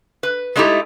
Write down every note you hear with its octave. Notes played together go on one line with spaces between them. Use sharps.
B4
G#3 A3 D#4 E4 G4 A4